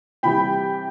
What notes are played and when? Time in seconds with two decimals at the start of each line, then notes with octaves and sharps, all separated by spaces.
0.23 C3 E3 G3 G5 B5